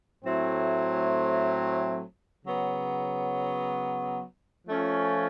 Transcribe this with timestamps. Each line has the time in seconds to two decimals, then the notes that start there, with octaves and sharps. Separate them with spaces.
0.22 A2 F#3 A3 C4 E4
2.44 C#3 F#3 B3
4.67 F3 A3 C#4 F4